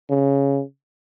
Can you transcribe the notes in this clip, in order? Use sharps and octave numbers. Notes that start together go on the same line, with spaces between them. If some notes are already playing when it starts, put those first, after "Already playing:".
C#3